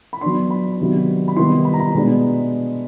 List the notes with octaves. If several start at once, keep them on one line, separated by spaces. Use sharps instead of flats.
B5
F#3 B3 D4 C6
B5
C3 D#3 F#3 B3 D4
B5
C3 D#3 G3 B3 E4 C6
B5
A#5
B5
B2 G#3 B3 D4